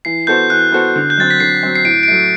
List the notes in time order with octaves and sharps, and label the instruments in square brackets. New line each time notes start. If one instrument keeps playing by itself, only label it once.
[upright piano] E3 [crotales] C7
[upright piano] B3 F#4 A4 C5 [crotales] G6
[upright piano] E3 [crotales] F#6
[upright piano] B3 F#4 A4 C5
D3
[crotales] G6
[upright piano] F#3 C4 [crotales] A6
[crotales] B6
[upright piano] D3 [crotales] C7
[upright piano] F#3 C4
[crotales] C7
[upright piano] A2 [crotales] D7
[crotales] D7
[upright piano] A3 [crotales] C7
[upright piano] F#3